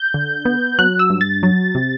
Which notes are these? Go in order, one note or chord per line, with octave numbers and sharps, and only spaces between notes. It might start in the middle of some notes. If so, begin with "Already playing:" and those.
Already playing: G6
D3
B3
F#3 F#6
E6
G2
A6
F#3
C3